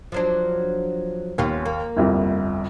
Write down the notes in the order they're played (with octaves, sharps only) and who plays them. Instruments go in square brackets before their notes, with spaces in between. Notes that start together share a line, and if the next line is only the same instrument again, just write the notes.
[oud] F3 F#3 D4
[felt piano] D#2 [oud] B3 C#4 F4
[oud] A#3
[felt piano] G1 C2 F2